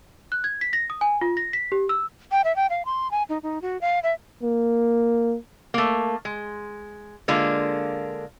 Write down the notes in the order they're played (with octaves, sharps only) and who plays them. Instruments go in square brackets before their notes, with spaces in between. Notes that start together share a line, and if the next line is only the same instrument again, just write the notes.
[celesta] F#6
G#6
B6
A#6
D#6
G#5
F4
A#6
B6
G4
E6
[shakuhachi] G5
E5
G5
F5
C6
G#5
D#4
D#4
F#4
F5
E5
[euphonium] A#3
[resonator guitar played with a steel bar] A3 A#3
G#3
D3 G#3 A#3 D4 F4